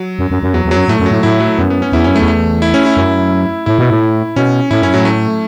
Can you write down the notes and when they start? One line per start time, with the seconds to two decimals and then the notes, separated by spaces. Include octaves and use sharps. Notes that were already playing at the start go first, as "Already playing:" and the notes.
Already playing: F#3
0.19 F#2
0.31 F#2
0.43 F#2
0.54 E2 F#3
0.65 E2
0.71 F#3
0.77 F#2
0.88 A2 A3
1.00 F#2
1.06 F#3
1.11 A2
1.23 A2 E4
1.40 F#3
1.58 F#2 B3
1.70 B3
1.82 C#4
1.92 E2 E4
2.04 F#2 C#4
2.16 A3
2.20 E2
2.28 A3
2.62 E4
2.74 C#4
2.86 E4
2.97 F#2
3.66 A2 E4
3.79 B2
3.90 A2
4.36 B2 C#4
4.71 A2 E4
4.82 F#2 C#4
4.94 A2 F#3
5.05 A3